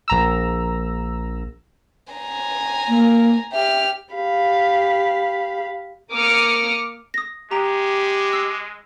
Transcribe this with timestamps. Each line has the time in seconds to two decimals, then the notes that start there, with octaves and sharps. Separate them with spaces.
0.08 A#1 A#5 E6
2.13 G#5 A#5
2.89 A#3
3.53 G4 E5 F6
4.14 G4 F5 B5
6.12 A#3 D6 D#6 F6 C#7
7.14 D#6 A#6
7.51 G#3 G4 A#5
8.33 E6 C7